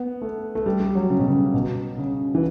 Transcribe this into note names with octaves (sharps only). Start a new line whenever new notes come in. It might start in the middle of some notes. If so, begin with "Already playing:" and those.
Already playing: B3
A3
A3
G3
G3
F#3
C#3
B2
C#3
B2
C#3
E3